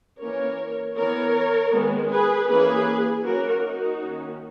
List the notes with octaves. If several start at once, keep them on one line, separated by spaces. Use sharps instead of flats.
E3 A#3 C#4 A#4 C#5
E3 B3 A#4 C#5
D#3 G#3 B3
G#4 B4
E3 A#3 C#4 G#4 B4
F#3 A#3 C#4 F#4 A#4
D#4 F#4
D#3 A#3 C#4